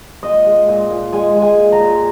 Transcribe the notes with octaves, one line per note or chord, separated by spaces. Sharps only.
A#2 D#5
G#3
A#2
A#2
G#3 G#5
G#3
G#5
A#2
A#5
A#2